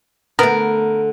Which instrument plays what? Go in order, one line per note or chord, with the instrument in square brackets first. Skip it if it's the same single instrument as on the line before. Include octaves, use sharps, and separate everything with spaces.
[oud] D3 A3 [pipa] B3 A#4